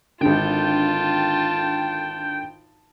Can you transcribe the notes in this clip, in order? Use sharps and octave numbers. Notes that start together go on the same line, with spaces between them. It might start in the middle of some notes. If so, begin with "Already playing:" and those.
G#1 D3 F4 G5 A5